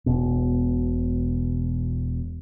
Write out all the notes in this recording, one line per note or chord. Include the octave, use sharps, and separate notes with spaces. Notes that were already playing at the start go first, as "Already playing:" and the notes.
E1 B2